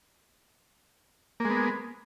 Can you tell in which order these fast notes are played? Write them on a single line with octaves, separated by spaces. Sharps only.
A#3 G#3 B3